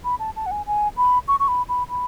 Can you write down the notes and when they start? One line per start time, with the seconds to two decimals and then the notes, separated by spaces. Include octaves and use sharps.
0.04 B5
0.20 A5
0.36 A5
0.46 F#5
0.51 G#5
0.67 G#5
0.97 B5
1.28 C#6
1.40 C#6
1.48 B5
1.69 B5
1.89 B5